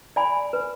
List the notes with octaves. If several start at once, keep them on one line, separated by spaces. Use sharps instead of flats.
D5 G#5 B5
B4